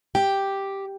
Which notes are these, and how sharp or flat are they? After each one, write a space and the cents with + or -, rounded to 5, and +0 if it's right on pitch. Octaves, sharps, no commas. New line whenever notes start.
G4 +0 G5 +0